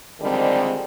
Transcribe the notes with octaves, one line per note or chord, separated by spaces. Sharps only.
D3 D#3 F3 G3 G#3 C4